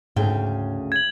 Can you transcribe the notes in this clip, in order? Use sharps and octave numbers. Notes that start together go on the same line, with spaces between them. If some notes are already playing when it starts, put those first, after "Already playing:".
D2 G#2 C#3 G5
G#6 F#7